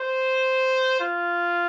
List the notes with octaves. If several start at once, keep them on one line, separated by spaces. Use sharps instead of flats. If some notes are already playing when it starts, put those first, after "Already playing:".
Already playing: C5
F4